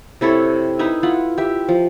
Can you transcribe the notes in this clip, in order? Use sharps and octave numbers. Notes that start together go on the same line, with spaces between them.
C3 E4 A4 C#5
D#4 E4 B4 E5
E4 F4 F#5
G4 E5
F3